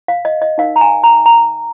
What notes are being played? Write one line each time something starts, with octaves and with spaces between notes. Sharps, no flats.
F5
D#5
D#5
D#4 A#4 F5
A#5
G#5
A#5
A#5